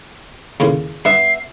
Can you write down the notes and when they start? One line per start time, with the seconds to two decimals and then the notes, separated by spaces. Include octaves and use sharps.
0.60 D#2 A2 C#3
1.05 G2 B3 E5 C7